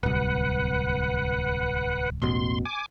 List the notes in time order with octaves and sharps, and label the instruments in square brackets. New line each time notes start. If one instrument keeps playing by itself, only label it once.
[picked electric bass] D1 C2 [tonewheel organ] B4 F#5
[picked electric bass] E1 A1 B2 [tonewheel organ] C6
[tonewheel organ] G#5 D6